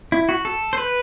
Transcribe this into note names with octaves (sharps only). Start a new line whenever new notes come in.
E4
F#4
A4
C5
B4